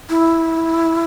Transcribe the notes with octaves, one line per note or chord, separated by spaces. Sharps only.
E4